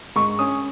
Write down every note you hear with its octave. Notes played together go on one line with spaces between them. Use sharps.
G#2 C#6
C#4 D#6